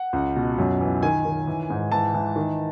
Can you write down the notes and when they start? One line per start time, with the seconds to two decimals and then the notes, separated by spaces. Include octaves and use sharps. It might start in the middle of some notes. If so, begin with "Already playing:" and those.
Already playing: F#5
0.13 C#2
0.36 B2
0.58 F#2
0.81 E3
1.03 D#3 G#5
1.25 D#3
1.47 E3
1.70 G#2
1.92 E3 A5
2.14 E3
2.36 D#3